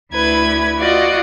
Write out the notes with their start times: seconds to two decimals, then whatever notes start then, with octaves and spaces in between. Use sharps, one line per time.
0.12 D2 E4 B4 G#6
0.77 F4 F#4 D5 D#5